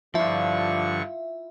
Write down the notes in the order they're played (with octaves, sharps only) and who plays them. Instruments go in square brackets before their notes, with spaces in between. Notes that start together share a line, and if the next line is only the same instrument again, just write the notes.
[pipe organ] G2 D3 C#6 [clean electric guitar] F3 [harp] E4 F4 [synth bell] E5